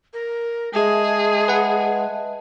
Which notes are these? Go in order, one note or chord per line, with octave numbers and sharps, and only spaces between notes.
A#4
G#3 G#4 D#5 E5 A5
B4 F#5